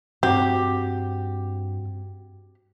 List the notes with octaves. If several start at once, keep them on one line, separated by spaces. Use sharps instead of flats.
G2 C4 F#4 G4